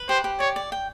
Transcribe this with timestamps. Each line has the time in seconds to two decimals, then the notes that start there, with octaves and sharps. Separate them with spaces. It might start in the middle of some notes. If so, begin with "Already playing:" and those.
Already playing: B4
0.09 G4 C5
0.24 G4
0.40 C#5 D5
0.56 D5
0.72 G5